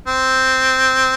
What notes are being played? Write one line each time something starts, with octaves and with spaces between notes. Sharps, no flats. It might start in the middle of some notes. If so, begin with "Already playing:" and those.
C4